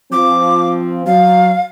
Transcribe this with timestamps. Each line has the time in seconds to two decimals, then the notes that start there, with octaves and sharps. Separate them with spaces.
0.12 F3 C4 D6
1.07 F#3 F5